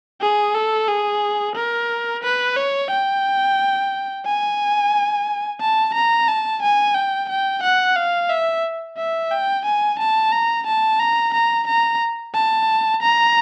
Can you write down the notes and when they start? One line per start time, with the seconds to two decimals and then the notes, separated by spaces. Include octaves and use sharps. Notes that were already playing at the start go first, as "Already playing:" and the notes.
0.21 G#4
0.55 A4
0.88 G#4
1.56 A#4
2.24 B4
2.57 C#5
2.91 G5
4.25 G#5
5.60 A5
5.95 A#5
6.28 A5
6.62 G#5
6.95 G5
7.29 G5
7.63 F#5
7.96 F5
8.30 E5
8.97 E5
9.31 G5
9.65 G#5
9.99 A5
10.32 A#5
10.67 A5
11.00 A#5
11.34 A#5
11.67 A#5
12.34 A5
13.02 A#5